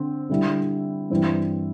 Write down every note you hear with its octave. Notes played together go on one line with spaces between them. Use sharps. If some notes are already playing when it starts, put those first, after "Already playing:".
Already playing: D3 C4
D3 G3 E4
G2 E3 C4 E4